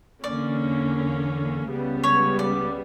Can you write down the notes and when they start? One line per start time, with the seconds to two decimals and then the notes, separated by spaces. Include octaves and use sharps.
0.24 E2 D3 A#3 C#4 D5
1.67 C#2 C#3 G3 B3
2.04 C#5
2.39 D5